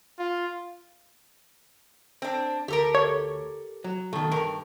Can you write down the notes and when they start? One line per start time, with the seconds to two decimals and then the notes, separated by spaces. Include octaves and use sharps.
0.19 F4
2.22 C4 D4
2.68 D2 G4 A4 A#4
2.95 C#5
3.84 F#3
4.13 B1 D#3 A3
4.31 G2 A#4